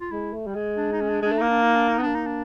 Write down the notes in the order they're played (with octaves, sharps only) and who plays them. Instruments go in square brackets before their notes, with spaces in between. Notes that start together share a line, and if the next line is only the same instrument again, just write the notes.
[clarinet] F4
[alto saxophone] G#3 [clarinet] E4
[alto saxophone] A3
G3
G#3
[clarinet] D4
D#4
C#4
D4
[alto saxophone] G#3 [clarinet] D4
[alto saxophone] A3
[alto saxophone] A#3 [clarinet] D#4
[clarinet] D4
D#4
D4
D#4
[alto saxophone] B3
[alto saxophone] A#3 [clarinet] D4
[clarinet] D#4
D4